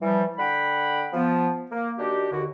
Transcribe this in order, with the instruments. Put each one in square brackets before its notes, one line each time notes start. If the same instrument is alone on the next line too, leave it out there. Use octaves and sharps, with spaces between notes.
[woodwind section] E3 F3 G3
D3 F#5 G5 B5
F3 B3
A#3
D#3 D4 F#4 G4
D#2 D3 F#4